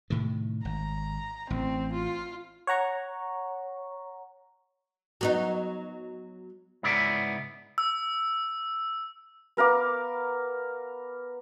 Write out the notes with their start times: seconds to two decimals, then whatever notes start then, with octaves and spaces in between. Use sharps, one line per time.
0.10 A2 C3 D#3
0.65 G#1 A#5
1.50 A1 C4
1.93 F4
2.67 C#5 F#5 A#5 C#6
5.21 F#3 B3 D#4
6.83 G#2 C#3 B3 E4 D5
7.78 E6
9.57 B3 A#4 F5 D6